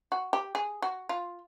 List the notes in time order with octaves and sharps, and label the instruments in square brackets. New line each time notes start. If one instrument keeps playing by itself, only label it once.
[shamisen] F#4
G4
G#4
F#4
F4